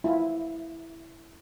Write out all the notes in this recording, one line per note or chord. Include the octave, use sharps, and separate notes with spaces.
E4 F4